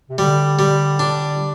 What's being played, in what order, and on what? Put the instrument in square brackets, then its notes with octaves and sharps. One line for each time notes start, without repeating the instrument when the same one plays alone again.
[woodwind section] C3
[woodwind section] D3 [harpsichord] G3
[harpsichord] G3
D4